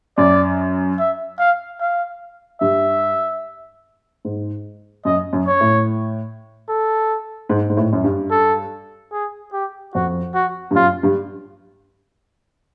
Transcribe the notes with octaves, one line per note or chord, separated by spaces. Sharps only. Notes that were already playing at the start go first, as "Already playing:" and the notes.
F#2 D5
E5
F5
F5
G2 E5
G#2
F#2 D#5
F#2
C#5
A2
A4
G#2
G#2
A2
F#2
G2
A4
G#4
G4
F2 F#4
F#4
G2
F#2 F4
G2